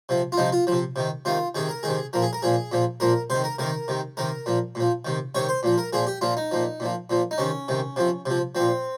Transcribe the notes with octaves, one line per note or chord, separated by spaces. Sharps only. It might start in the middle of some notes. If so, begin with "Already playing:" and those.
C3 F3
F4
C3 F3 D#4
F4
C3 F3
C3 D#3
C3 D#3 F4
C3 D#3 G#4
A#4
C3 D#3 G#4
A#2 F3 A#4
G#4
A#4
A#2 F3 G#4
A#2 F3
A#2 F3 A#4
C3 D#3 C5
A#4
C3 D#3 A#4
C3 D#3
C3 D#3 A#4
A#2 F3
A#2 F3
C3 D#3
C3 D#3 C#5
C5
A#2 F3
A#4
A#2 F3 G#4
G4
A#2 F3 F4
D#4
A#2 F3
A#2 F3
A#2 F3
D#4
C3 D#3 C#4
C3 D#3
C3 F3
C3 F3
A#2 F3 C4